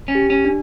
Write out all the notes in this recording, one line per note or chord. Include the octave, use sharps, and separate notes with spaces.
C#4
G4
C#4
D4